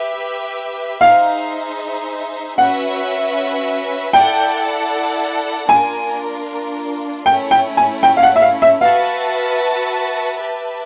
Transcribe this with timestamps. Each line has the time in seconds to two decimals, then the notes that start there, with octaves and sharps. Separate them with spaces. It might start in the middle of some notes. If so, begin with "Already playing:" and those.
Already playing: G4 B4 E5
1.01 D#4 G#4 C5 E5 F5
2.57 C#4 F#4 B4 E5 F#5
4.13 E4 A4 D5 F#5 G5 A5
5.69 A#3 D4 F4 A#4 G#5
7.25 A3 C#4 E4 G5
7.51 G5
7.77 G#5
8.03 G5
8.17 F5
8.23 F#5
8.36 E5
8.42 F5
8.62 E5
8.81 F#4 B4 E5 F5 A5
10.36 G4 B4 E5 A5